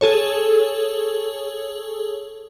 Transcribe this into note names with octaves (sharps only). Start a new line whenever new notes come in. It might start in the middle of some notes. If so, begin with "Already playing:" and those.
G#4 A4 C#5